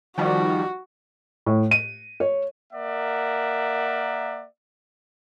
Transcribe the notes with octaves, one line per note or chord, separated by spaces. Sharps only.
D#3 F3 G3 F#4
A2
D#7
C#5
A#3 A#4 D5 E5 F#5